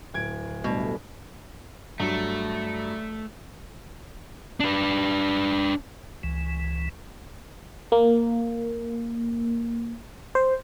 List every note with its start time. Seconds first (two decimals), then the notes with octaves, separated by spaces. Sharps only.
0.14 D1 G#6 D7
0.64 B2 G3 A3 D4
2.00 G2 F#3 A3
4.60 D4 B4
6.23 C#2 E3
7.92 A#3
10.35 C5